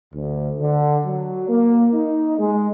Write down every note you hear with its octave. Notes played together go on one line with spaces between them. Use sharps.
D2
D3
F#3
A#3
D#4
G#3